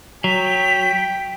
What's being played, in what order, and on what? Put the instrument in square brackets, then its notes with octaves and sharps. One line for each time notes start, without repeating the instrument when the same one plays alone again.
[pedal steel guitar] F#3 [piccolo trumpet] G5 [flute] B6